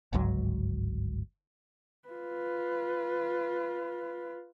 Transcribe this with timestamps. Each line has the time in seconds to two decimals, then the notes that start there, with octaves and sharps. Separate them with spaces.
0.13 G1 C#2 G#2 F#3
2.09 F4 B4